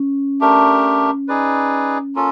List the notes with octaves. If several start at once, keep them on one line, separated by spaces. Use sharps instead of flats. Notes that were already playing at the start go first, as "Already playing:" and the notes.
Already playing: C#4
A3 D4 G4 A#4
D#4 G#4 B4 D5
A#3 C#4 F4 A4